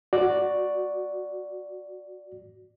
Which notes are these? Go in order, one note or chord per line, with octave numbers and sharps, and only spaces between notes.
F#4 D5